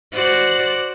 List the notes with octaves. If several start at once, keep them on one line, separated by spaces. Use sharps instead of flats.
F#4 C5 D5